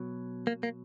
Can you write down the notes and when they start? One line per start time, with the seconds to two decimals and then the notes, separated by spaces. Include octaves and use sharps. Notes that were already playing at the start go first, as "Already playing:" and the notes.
Already playing: B2 F#3
0.47 A#3
0.63 A#3